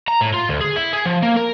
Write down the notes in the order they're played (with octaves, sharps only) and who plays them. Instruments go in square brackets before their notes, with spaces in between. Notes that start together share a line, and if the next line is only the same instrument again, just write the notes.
[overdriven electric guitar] A#5
A2
F4
D2
G#4
E4
G#4
F3
A#3
A#4